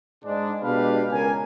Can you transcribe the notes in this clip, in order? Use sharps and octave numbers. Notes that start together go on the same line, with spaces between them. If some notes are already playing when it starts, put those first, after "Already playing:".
G#2 G#3 D4
B2 G#3 D4 G4 B4 F5
C#2 A#4 G#5